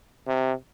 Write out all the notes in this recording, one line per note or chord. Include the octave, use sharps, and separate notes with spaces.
C3